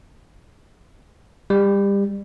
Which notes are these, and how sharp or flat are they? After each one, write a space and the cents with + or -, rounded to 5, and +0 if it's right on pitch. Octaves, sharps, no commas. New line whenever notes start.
G3 +25